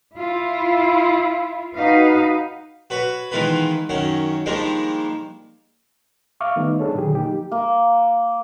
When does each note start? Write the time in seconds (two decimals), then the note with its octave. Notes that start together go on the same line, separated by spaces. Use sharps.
0.16 E4 F4
1.75 D#4 F#4 B4 F5
2.90 F#4 B4 C#5
3.31 D#3 E3 G#3 B3 F4 B4
3.89 F#2 D#3 C#4 F#5
4.46 D#3 F3 G3 G#3 A#3 D4
6.40 E5 F5 C#6 D6 F6
6.56 D#3 G3 A3 B3 D#4
6.79 D4 D#4 G#4 A4 C#5
6.95 A#2 D3 D#3 F#3 G4 G#4
7.15 F3 A#3 D#4 G4
7.52 A#3